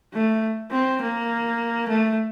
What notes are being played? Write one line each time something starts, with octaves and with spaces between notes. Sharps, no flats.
A3
C4
A#3
A3